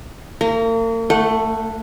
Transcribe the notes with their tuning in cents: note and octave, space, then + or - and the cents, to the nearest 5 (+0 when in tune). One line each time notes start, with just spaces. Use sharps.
A#3 -40 A#5 +0
A3 +10 F#5 -15